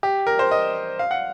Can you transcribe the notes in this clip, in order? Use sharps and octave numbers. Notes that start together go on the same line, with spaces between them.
G4
A#4
C5
D#5
F5
F#5